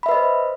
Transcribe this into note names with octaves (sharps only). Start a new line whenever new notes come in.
B4 C5 D#5 E5 B5